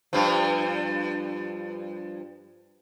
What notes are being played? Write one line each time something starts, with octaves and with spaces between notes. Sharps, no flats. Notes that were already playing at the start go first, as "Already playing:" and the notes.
G2 F3